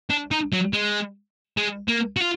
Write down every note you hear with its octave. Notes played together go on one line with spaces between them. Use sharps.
D4
D#4
F#3
G#3
G#3
A#3
F#4
F4